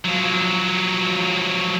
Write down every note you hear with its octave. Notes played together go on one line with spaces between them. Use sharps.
F3 F#3